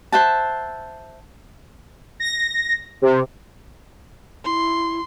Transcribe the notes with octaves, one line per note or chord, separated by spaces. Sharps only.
C5 E5 F#5 A5
A#6
C3
E4 C6